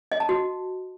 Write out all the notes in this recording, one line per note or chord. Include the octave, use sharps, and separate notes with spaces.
D#5
A5
F#4